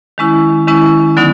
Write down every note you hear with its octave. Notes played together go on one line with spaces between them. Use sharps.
D#3 G#3 C#4 E4
D#3 G#3 C#4 E4
D3 F#3 B3 D#4